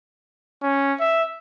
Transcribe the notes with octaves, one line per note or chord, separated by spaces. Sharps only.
C#4
E5